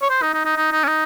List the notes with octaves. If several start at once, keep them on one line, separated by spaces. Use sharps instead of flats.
C#5
C5
D#4
D#4
D#4
D#4
D#4
C#4
D#4